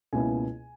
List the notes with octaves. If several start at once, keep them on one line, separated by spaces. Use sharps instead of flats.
C#2 B2 A#3 E4 G#5